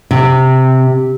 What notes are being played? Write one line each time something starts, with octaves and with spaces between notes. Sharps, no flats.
C3